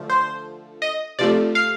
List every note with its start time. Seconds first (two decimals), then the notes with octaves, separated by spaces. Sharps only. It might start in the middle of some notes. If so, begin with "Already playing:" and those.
Already playing: D3 F3 A3
0.10 C5
0.82 D#5
1.19 C3 F3 A3 D5
1.55 F5